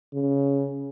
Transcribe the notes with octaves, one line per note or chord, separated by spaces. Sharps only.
C#3